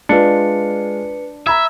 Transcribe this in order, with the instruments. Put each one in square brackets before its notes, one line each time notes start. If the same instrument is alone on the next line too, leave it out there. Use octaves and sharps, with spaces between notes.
[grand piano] G#3 F4 [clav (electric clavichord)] D4 [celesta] B4 C#7
[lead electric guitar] E5 [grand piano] A#5 B5 G#6